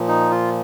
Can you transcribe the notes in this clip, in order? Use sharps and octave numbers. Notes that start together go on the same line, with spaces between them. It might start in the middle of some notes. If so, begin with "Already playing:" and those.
Already playing: A#2 F3
D#4
F4